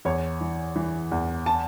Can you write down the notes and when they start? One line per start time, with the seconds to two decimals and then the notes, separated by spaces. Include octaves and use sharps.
0.05 E2 C#5
0.41 E3
0.76 E3
1.12 E2
1.46 A5